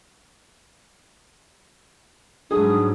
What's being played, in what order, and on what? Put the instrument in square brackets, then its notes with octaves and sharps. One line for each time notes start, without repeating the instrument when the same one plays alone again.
[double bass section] G#2 F#3 G3 [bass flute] D4 [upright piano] G#4 [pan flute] D#6